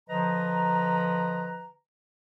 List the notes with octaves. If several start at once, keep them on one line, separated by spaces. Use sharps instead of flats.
D3 F3 B4 D#5 A#5